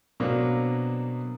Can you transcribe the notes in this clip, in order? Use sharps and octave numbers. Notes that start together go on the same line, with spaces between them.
B2 F#3 A#3 C4 D4